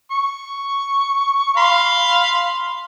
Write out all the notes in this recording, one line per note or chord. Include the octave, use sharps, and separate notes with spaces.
C#6
F5 B5 C6